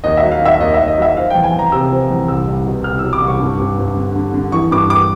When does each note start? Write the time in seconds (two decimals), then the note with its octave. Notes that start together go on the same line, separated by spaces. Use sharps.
0.04 D#2 D#5
0.17 E5
0.22 F#3
0.31 F5
0.42 D#3 E5
0.60 D#2 D#5
0.74 E5
0.79 D#2
0.88 D#5
0.97 F#3 E5
1.17 F3 F5
1.30 E2 G5
1.44 G#5
1.54 E2
1.59 A#5
1.72 C3 E6
1.91 F3
2.10 E2
2.28 C2 E6
2.47 C2
2.66 B2
2.84 C2 F6
2.99 F#3 E6
3.13 D6
3.22 C2
3.27 C#6
3.40 G2
3.60 G2
3.79 G2
3.97 D3
4.16 D3
4.34 D3
4.52 E3 C#6
4.71 G2 D6
4.90 D6